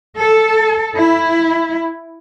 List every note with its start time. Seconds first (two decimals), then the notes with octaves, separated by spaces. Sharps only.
0.16 A4
0.96 E4